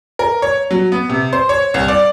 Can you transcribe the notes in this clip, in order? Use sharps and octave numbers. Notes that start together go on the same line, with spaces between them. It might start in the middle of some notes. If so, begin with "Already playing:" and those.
A#4
C#5
F#3
B3
C3
C5
C#5
C2
D5